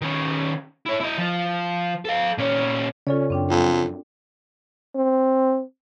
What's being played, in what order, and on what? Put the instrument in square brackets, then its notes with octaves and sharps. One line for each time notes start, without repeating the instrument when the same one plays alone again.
[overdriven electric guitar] D#3 C#4
E4 C#5
E4 D#5
F3
A4 F5
A#2 C#4
[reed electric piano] C#3 C#5 [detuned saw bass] C#4 [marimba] F4 A4 D5
[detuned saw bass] F#2 [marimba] C4 D4 G5
[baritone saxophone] F2
[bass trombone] C4